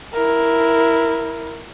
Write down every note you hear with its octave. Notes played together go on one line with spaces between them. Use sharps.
E4 A#4